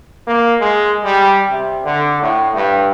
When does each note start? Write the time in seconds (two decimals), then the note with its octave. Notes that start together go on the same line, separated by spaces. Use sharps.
0.27 A#3
0.60 G#3
1.04 G3
1.51 C3
1.84 D3
2.22 A2
2.55 G2